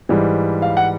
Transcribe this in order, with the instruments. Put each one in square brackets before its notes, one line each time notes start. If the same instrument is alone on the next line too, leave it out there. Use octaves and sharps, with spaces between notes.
[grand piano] G#2 E3 G3
F5
F#5